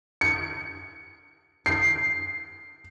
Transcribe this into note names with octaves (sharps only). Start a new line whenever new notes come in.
C#7
C7